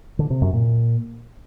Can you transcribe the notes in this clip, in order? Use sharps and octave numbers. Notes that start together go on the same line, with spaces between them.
D3
C3
F#2
A#2